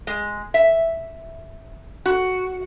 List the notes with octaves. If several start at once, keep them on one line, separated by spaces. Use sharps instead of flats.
G#3
E5
F#4